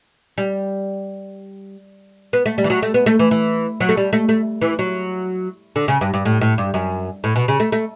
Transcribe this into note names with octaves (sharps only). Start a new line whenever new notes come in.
G3
B3
A3
G3
E3
F#3
A3
B3
A3
E3
E3
F#3
A3
G3
A3
A3
E3
F#3
D3
C#3
G2
G2
A2
A2
G2
F#2
A2
B2
C#3
A3
A3